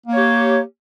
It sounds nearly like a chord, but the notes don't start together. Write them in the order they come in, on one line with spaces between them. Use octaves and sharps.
A#3 C#5 G4